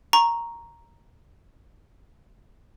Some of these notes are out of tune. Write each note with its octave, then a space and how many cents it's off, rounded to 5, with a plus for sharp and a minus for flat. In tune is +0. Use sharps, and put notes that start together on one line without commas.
A#5 +0 C#6 -10